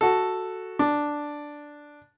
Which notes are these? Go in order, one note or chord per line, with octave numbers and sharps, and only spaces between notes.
F#4 A4
D4